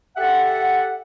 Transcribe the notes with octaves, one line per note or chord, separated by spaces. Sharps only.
G4 A4 E5 F#5